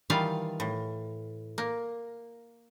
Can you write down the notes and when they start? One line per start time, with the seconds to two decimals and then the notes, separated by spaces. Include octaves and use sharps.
0.10 D#3 E3 G3 F4 F5
0.60 A2
1.58 A#3